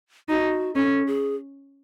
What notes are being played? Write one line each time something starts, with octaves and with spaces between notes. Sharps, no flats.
D#4 F#4
C#4 A4
G#4